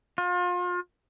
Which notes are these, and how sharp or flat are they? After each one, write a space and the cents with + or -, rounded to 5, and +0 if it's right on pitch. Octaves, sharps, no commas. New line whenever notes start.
F4 +35